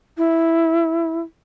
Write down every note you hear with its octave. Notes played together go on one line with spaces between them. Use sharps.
E4